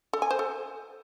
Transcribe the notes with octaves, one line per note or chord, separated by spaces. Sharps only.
A4
G#5
C5
A4